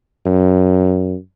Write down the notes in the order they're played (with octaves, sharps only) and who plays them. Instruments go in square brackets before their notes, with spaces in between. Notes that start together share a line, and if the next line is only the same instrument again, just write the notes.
[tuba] F#2